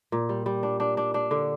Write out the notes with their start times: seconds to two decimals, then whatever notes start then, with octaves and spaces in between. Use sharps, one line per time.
0.12 A#2
0.29 G3
0.46 G3
0.63 D4
0.80 D4
0.97 D4
1.14 D4
1.31 D3